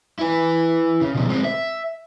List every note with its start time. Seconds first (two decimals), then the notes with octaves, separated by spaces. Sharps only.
0.19 E4 B4
1.01 C#3
1.15 B2 F3
1.29 G#3 C4
1.44 E5